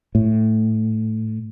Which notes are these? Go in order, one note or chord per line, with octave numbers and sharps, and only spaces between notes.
A2